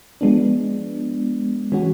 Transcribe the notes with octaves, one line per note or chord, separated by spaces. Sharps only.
F3 G#3 B3 D4
E3 G#3 C#4 F#4